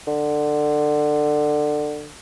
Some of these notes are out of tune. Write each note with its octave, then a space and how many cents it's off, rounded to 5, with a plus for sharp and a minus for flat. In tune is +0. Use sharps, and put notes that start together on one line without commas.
D3 +20